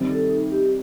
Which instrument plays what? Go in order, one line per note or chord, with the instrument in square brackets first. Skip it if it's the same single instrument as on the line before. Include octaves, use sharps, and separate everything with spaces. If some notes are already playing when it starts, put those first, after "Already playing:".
Already playing: [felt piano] C3 D#3 G3 C4
[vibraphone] A4
D#4
G4